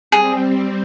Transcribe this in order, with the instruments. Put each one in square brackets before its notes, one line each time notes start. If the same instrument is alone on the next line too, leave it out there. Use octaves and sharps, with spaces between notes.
[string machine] G3 C4 [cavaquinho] G#4